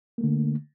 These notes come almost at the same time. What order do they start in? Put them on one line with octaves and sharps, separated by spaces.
A#3 A3 D3